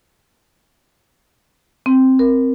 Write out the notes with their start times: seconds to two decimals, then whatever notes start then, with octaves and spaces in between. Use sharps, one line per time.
1.86 C4
2.19 A#4